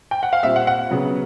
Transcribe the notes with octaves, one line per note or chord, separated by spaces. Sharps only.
G5
F#5
F5
A#2 G3 C4 E5
F#5
F#5
C#3 F#3 B3